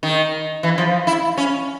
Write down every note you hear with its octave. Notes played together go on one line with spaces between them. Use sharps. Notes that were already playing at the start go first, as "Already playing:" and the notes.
D#3
E3
F3
E4
C#4